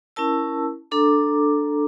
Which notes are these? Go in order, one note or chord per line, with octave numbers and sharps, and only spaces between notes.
C#4 E4 A#4 A5 E6
D4 A4 A#5 D6